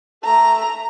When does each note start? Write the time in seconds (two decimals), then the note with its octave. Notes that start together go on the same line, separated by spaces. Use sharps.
0.24 A3 A#5